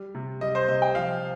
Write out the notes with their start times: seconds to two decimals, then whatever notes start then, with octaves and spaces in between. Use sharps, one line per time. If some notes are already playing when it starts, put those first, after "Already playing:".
Already playing: G3
0.15 C3
0.41 G3 D#5
0.55 C5
0.68 C3 D#5
0.82 G5
0.95 F3 F5